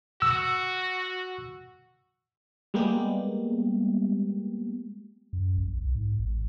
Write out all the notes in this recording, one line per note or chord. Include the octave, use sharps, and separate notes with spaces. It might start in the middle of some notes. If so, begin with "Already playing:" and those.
F#4 E6
G3 G#3 A#3 B3 G4
F#2
A#1
B1
G#2
A1